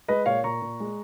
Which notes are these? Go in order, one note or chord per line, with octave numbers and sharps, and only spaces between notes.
G#3 B4 D#5
A#2 C#5 F5
A#2 A#5 C#6
A#2
G#3